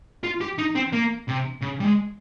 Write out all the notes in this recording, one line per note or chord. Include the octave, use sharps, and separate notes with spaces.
F4
G4
D#4
C4
A#3
C3
C#3
G3
G#3